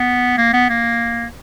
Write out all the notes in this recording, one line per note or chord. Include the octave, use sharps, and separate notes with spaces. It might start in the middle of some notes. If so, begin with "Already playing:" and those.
Already playing: B3
A#3
B3
A#3